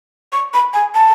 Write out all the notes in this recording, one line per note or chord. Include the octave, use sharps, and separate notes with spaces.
C#6
B5
G#5
A5